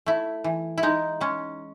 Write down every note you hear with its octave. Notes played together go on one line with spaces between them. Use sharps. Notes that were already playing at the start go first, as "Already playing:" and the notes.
A3 E4
E3
E4
G#3 D#4
G#3 C#4